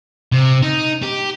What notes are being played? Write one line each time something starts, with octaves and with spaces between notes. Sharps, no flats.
C3
D#4
G4